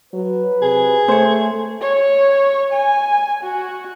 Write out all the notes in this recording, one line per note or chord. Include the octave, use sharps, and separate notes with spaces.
F#3 B4
C3 G#4
A3 C5 C#5
C#5
G#5
F#4